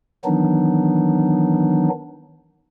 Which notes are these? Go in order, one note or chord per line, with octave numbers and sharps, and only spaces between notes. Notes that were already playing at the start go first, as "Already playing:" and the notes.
D#3 E3 F#3 B3 D4 D#4